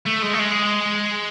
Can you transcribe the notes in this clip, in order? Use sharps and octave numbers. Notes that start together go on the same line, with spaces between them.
A3
G#3
A3
G#3